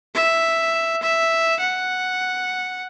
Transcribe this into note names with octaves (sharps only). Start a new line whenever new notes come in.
E5
E5
F#5